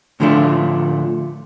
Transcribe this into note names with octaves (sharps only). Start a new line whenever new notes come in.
A2 D3 F3 A3 D4 F4